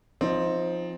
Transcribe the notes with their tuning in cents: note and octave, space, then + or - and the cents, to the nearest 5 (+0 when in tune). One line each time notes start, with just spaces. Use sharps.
F3 +0 C4 +5 D#4 +20